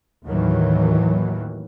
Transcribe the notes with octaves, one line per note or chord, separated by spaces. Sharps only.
D#2 A2 D#3 E3 F#3